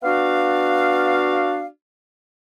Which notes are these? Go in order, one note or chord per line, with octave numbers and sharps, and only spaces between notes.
B3 D4 F#4 D5 F5